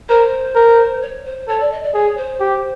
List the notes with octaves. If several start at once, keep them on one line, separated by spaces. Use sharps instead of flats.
A#4 C5
A#4
C#5
C5
A4 C#5
D5
D#5
D5
G#4 C#5
C5
G4